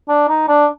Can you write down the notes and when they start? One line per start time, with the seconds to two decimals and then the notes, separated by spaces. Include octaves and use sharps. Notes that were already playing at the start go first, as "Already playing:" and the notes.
0.09 D4
0.29 D#4
0.48 D4